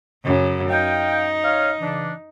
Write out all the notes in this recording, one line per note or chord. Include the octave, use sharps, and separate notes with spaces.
F#2 C#3
D#4 F5 G5
C#5 F5
C#3 E3 D4